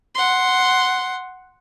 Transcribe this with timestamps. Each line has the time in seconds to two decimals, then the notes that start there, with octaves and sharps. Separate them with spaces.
0.15 F#5 C6